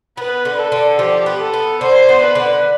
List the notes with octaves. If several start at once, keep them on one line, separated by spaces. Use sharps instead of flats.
B3 B4
D3
A4
D3
F3 G4
B3
A4
B3
D3 C5
B3
B4
D3